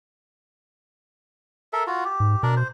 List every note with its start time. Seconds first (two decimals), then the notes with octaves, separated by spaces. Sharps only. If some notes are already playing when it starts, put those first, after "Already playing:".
1.73 A4 A#4 E5
1.87 F4 F#4
2.05 G4
2.20 G#2
2.43 B2 D4 A#4 D5
2.57 C5